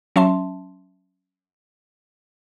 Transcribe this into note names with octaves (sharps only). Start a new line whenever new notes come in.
F#3 C#4 E5 A5 C6